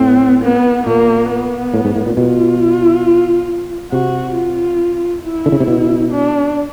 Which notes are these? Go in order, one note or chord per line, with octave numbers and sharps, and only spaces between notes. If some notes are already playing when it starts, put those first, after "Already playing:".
Already playing: A2 C4
B3
A#2 A#3
B3
A2
G#2
A2
A#2
B2 F4
C3 F#4
F4
E4
D3
C#3
C3
B2
D4